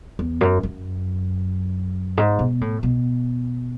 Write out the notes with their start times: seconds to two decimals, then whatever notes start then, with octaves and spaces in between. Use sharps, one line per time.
0.19 E2
0.41 F#2
0.63 F#2
2.17 G#2
2.39 B2
2.61 A2
2.83 B2